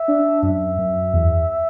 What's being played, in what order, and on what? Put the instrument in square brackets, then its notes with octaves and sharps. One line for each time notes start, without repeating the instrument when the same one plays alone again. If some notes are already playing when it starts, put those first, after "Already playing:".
Already playing: [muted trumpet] E5
[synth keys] D4
[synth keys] F#2 [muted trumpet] E5
[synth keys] F#2
E2